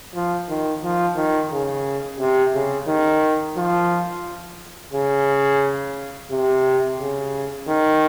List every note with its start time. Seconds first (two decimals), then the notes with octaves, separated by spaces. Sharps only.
0.14 F3
0.49 D#3
0.83 F3
1.16 D#3
1.51 C#3
2.19 C3
2.54 C#3
2.87 D#3
3.57 F3
4.93 C#3
6.31 C3
6.99 C#3
7.68 D#3